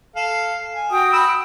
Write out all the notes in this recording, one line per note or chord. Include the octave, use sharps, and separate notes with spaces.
A4 F5
G#5
F#4 G5 D#6
F#5 B5 E6